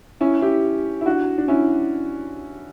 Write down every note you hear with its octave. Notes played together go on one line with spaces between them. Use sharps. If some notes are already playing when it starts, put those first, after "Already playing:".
C#4 E4
E4 G4
E4
D4 F#4
D4
C#4 E4